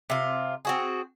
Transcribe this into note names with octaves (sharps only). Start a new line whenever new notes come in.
C3 F4
C4 F#4 G#4